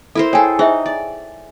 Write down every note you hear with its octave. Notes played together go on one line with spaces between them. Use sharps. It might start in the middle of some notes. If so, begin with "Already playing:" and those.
E4 A4 A#4 C5
G#4 A4 C#5 G5 G#5
D#4 G#4 C5 E5
D5